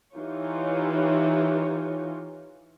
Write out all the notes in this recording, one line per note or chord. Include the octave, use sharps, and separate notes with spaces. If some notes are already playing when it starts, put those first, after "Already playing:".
E3 D#4 F4 G4 C#5